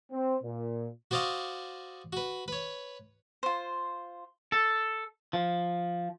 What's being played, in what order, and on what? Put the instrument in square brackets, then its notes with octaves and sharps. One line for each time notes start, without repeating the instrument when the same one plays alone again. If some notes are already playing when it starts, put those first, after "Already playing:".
[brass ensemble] C4
A#2
[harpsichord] F#4 C5 D5 D#5 F5 C#6
F#4 B4
B4 C#5
[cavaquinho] F4 C5
[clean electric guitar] A4
F3